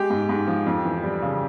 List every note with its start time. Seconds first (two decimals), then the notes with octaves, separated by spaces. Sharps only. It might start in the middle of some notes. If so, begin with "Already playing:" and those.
Already playing: G#3 G4
0.10 G#2
0.29 G#2
0.47 F3
0.67 F2
0.85 E3
1.03 G3
1.22 C#3